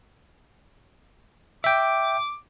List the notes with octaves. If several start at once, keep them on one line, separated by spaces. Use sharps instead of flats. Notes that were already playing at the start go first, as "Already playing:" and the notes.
E5 G5 D6